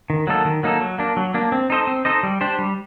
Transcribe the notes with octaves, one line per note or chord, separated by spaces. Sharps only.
D#3
F#3 A#3 D#4 A4
D#3
F#3 A#3 D#4 A4
F#3
A#3 D4
F#3
A#3 D4
C4
D#4 A4 C5 D#5
C4
D#4 A4 C5 D#5
G3
D4 G4 C5
G3